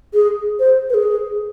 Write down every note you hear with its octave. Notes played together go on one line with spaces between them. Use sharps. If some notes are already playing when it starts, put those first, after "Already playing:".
G#4
C5
B4
G#4